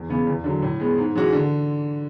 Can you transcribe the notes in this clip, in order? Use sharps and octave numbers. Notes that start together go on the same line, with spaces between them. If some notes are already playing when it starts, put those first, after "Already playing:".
Already playing: E2
C#3 E3 B3
E2
D3 F#3
A2
G#3 B3
G#2
E3 G#3 C#4 F#4
D3